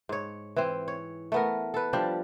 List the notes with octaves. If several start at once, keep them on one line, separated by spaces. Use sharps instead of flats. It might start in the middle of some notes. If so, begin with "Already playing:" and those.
G#2 C#5
E3 C4
C#5
A3 B3 A#4
A4 B4
F3 G3 D4 G4